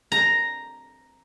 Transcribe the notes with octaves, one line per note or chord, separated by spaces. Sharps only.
A#5